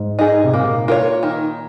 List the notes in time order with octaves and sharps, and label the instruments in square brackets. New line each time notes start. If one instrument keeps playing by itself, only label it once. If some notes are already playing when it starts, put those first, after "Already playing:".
Already playing: [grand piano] G#2
[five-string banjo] D#4 G#4
[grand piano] C3
[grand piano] A#2 [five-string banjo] A#3
[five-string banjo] F4 A#4 C#5
D#3